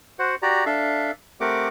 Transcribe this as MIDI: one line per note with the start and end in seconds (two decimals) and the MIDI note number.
0.19 0.35 66
0.19 0.35 72
0.19 0.35 78
0.42 0.65 66
0.42 0.65 67
0.42 0.65 74
0.42 0.65 82
0.66 1.11 62
0.66 1.11 69
0.66 1.11 76
0.66 1.11 77
1.40 1.68 57
1.40 1.68 60
1.40 1.68 67
1.40 1.68 70
1.40 1.68 78
1.40 1.68 86